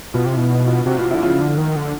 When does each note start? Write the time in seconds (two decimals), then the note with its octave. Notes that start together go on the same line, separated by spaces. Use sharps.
0.14 B2 F4
0.26 C3
0.32 B2 E4
0.50 D#4
0.67 F4
0.86 C3 F#4
0.98 B2 F4
1.04 C3
1.11 D3 E4
1.22 C#3 F4
1.41 D3
1.58 D#3
1.76 D3